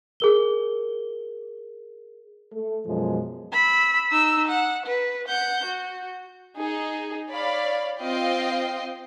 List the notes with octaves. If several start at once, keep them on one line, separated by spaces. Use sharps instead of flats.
G#4 A#4 G7
A3 A4
F#2 B2 F3 G#3
B5 E6
D#4 E6
F#5
B4
F#5 G6
F#4
D#4 G#4
C#5 D5 F5 B5
C4 F4 D#5 F5 G5 C7